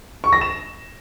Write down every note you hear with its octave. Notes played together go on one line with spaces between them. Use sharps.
C#6
A#6
E7